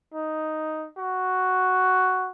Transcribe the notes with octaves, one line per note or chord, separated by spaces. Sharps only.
D#4
F#4